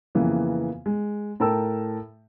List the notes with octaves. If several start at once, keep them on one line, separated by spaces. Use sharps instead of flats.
F2 C#3 E3 A#3 B3
G#3
A2 A4 A#4 G5 A5 E6